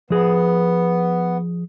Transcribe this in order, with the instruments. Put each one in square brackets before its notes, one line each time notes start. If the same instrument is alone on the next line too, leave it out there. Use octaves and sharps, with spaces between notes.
[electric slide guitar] F3 G#4 [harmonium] B3